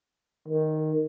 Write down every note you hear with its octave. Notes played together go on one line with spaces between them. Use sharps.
D#3